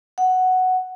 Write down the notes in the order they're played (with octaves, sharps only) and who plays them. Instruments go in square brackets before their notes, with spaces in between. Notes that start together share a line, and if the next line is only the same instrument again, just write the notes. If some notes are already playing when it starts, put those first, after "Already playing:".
[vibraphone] F#5